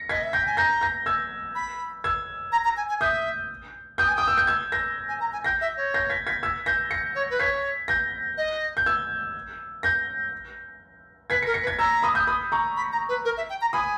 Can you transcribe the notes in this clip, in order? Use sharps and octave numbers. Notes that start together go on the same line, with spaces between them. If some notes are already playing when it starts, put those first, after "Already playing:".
Already playing: A#6 C#7
D#5 G#6 B6
E5
G5 G6 A#6
G#5
A#5 G6 A#6
G6 A#6
E6 G#6
B5
E6 G#6
A#5
A#5
G#5
G#5
E5 D#6 G6
G5 D#6 G6
G#5
G5 D#6
E6
G6
E6 G#6
G6 A#6
G#5
A#5
G#5
G5 G6 A#6
E5
C#5
G6 A#6
G#6 B6
G#6 B6
E6 G#6
G6 A#6
A#6 C#7
C#5
B4
C#5 G#6 B6
G6 A#6
D#5
G6
E6 G#6
G6 A#6
B4 G#6 B6
A#6 C#7
A#4
A#6 C#7
B4
G#6 B6
A#5 E6 G#6
B5 D#6
D#6 G6
B5 D#6
A#5 C#6
B5
A#5
B4
A#4
E5
G5
A#5
G#5 B5 D#6